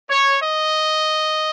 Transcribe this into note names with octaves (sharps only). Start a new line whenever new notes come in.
C#5
D#5